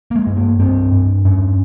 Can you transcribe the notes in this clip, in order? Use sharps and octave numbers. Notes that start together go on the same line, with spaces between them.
A#3
G#3
G2
A#3
G2 C4
G2
G2 C#4